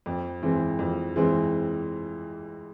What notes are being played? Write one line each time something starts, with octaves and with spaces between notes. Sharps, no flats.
F2
E3 G#3 C4
F2
E3 G#3 C4